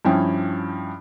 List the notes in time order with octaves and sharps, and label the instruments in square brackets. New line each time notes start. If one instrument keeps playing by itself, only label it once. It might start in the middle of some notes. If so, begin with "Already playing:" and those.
[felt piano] G2 F3 C#4 E4 G5